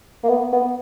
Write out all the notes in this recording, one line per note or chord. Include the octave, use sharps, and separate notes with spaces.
A#3
B3
B3